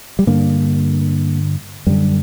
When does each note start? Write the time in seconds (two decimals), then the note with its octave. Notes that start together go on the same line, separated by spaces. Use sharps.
0.19 G3
0.27 G2 D3 A#3
1.87 F#2 D3 G3